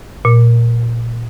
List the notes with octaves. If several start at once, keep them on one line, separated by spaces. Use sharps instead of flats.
A#2